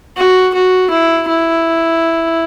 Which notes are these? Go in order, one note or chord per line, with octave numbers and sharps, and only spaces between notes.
F#4
F#4
E4
E4